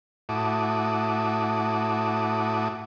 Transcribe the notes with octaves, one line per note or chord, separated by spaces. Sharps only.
A2 E4 F#4 A4 D6 D#6